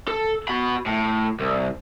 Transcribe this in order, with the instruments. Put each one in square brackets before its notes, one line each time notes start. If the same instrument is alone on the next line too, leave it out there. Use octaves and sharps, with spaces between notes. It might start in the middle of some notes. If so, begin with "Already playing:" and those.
[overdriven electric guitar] A4
F#4 B5
A2
C2